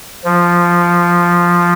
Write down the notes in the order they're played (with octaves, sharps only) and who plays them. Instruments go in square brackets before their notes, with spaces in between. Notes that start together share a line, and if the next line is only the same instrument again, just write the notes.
[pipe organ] F3